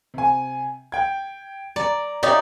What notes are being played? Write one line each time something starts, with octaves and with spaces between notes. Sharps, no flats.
C3 G#5
G5 G#6
D5 A#5
D#4 F#4 G4 C#5 D5 E5